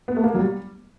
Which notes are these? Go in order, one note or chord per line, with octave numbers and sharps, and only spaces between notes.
B3
A3
A#3
F#3
G3